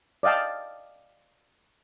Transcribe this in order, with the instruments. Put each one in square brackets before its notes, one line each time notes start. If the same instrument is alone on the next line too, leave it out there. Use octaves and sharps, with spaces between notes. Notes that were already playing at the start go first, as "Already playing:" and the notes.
[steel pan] D5 D#5 F5 G5 A5